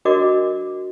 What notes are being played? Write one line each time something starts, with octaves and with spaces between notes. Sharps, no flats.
D4 F#4 A#4 D#5 D6